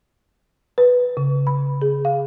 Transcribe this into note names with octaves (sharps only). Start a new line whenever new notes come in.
B4
C#3
B5
G#4
F5